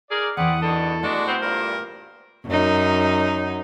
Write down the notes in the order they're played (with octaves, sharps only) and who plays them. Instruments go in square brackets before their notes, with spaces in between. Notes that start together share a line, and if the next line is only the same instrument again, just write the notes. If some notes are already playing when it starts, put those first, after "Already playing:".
[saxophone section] D#4 A#4 D5 [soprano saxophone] G#4
[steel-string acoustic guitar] E2 E3 [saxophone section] C4 E4 D5 [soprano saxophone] F#5 [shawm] D#6
[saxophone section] B2 D#3 D4 [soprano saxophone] A4
[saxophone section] G#3 D4 [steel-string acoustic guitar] A3 [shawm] F#4
[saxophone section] B3 C4 [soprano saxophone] C5
[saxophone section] G2 A#2 [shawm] A#4
[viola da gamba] F#2 D#4